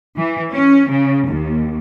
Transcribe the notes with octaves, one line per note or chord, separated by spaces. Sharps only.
E3
C#4
C#3
D#2